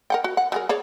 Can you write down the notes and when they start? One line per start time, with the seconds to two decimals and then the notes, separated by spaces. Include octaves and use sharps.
0.10 A#4 F#5 G5
0.24 F#4
0.37 F#5
0.52 F#3 G#4 A#4
0.69 G#4 C#5 D5